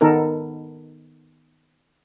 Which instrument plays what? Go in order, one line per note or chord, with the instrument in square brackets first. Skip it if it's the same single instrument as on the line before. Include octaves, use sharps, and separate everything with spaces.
[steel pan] D#3 B3 D#4 A4 A#4